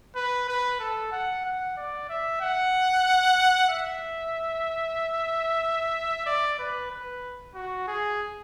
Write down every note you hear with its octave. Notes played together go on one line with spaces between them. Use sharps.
B4
B4
A4
F#5
F#5
D5
E5
F#5
E5
D5
B4
B4
F#4
G#4